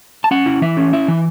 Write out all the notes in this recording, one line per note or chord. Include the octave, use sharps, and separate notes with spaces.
A5
C#4 F#5
E4
E3 E5
C#4
E4 E5
E3